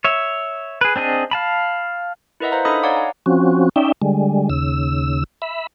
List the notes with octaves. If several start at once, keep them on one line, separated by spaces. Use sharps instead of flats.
C#5 E5
G#4 B4
C4 D4 G#4 D#5
F5 A5 B5
E4 A#4 B4 D#5 E5 F#5
C5 F5 A#5
D4 D#4 A4 D#5 B5 D#6
C#5 D5 F5 F#5 A#5 D6
G#5
F3 C4 C#4 F#4
C#4 D#4 D5 E5 G5
D3 G3 G#3
D#2 C#3 E6
E5 B5